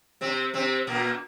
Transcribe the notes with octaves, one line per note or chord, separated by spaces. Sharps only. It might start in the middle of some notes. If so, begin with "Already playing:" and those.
C3 C4
C3 C4
A#2 A#3